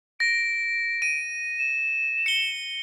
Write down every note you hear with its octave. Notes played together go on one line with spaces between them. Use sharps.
A#6 D7
D#7
E7
C#7 G7